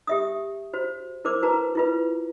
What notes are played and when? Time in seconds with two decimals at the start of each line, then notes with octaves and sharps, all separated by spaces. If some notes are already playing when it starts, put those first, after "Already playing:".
0.07 G4 E5 D#6
0.73 F#4 C5
1.25 E4 A#4 C5 D6
1.43 F#4 B4 A5 A#5
1.75 E4 F4 B4